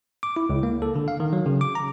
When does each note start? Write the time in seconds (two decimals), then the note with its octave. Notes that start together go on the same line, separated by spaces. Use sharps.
0.23 D6
0.36 E4
0.49 C#2
0.63 A#3
0.82 A4
0.96 D3
1.08 F5
1.20 D#3
1.33 F#3
1.46 C#3
1.61 D6
1.75 A#5